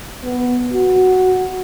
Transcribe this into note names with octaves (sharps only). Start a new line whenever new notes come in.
B3
F#4